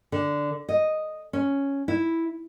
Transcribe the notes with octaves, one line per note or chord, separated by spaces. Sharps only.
D3
D#5
C#4
E4